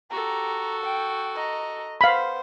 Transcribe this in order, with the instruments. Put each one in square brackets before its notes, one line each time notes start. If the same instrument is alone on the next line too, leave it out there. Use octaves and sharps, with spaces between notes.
[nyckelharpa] F#4 A4 [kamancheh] G4 A#5
[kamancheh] G5
D#5 A#5
[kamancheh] B3 C5 [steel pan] F5 B5